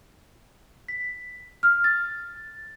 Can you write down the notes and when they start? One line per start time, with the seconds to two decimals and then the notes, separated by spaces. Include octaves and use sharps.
0.88 B6
1.63 F6
1.84 A6